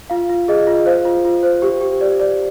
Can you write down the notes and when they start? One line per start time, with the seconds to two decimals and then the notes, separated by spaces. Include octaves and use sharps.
0.10 F4 F5
0.29 F4
0.48 G#4 D#5
0.67 F4
0.86 C5 F5
1.05 F4
1.25 F4
1.43 C5
1.62 G4
1.81 G4
2.01 D5
2.20 D5